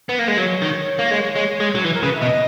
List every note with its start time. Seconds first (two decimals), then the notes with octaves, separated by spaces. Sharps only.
0.09 B3
0.19 A#3
0.28 G#3
0.37 F#3 C#5
0.62 D#3
0.99 A#3
1.11 G#3
1.36 G#3
1.60 G#3
1.75 F#3
1.84 E3 B4
1.94 A#4
2.03 C#3 B4
2.15 E5
2.21 B2 D#5